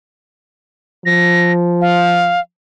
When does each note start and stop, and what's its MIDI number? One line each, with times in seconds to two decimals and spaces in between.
1.06 2.37 53
1.06 1.52 94
1.81 2.40 77